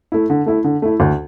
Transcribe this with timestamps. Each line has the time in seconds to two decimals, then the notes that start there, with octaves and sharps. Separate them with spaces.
0.12 A3 E4
0.30 D3
0.46 A3 E4
0.64 D3
0.82 A3 E4
1.00 D2